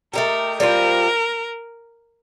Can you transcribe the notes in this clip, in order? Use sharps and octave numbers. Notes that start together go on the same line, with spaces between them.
A3 D#4 G4 A#4
G3 C4 F4 A#4 C5